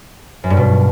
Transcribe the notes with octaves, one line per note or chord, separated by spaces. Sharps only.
F#2
G2
B2